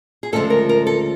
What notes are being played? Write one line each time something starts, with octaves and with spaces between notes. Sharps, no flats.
G#4
D2 C#3 F3 G#3 A4
A#4
A#4
A4